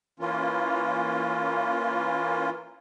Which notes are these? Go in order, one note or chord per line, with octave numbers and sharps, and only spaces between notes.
E3 A#3 C#4 F4